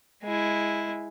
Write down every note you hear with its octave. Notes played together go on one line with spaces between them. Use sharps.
G#3 E4